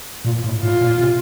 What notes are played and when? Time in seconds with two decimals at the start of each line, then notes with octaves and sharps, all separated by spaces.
0.25 A#2
0.44 A2
0.62 A2 F4
0.81 A#2
0.99 C3